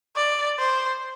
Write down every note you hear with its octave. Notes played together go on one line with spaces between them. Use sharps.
D5
C5